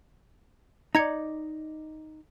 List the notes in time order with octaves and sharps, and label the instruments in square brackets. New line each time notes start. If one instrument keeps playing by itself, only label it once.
[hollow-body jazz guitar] D#4 D5 [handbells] A#5 G#6 C#7